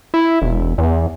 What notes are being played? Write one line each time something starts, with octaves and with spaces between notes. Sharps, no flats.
E4
E1
E2